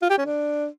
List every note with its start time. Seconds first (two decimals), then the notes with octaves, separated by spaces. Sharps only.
0.02 F4
0.10 G4
0.18 C#4
0.26 D4